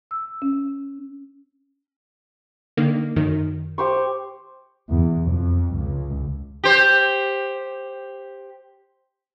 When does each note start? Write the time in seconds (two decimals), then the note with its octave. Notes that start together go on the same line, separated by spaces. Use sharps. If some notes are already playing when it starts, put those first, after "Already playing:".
0.11 E6
0.42 C#4
2.77 D3 D#3 A#3
3.16 F#2 D#3
3.78 G4 C5 C#6
4.89 E2
5.30 F2
5.75 C#2
6.64 G4 C5